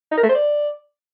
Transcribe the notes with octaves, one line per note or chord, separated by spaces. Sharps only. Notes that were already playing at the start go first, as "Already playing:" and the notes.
D#4
A#4
A3
C5
D5